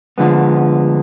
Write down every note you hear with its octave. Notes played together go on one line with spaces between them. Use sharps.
D2 D3 F3 G#3 B3